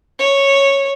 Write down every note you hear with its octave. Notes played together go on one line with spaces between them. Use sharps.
C#5